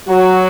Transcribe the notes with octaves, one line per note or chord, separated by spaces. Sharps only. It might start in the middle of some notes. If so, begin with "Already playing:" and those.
F#3 F#4